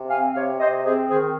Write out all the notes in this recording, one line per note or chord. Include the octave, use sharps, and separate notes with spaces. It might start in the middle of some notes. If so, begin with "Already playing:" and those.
Already playing: C3
C4 F5 G#5
C3 C#5 F5
C3 C5 D#5
C4 G#4 C5
D#3 G#4 C5